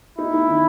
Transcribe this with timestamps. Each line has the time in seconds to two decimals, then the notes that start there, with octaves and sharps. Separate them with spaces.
0.18 D#4 E4
0.34 D#4
0.48 D#3